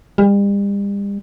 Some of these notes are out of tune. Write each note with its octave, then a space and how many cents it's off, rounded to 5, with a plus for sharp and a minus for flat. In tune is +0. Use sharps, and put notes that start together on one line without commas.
G3 +40